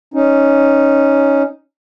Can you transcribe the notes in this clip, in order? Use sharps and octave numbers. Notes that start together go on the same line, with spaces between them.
C#4 D#4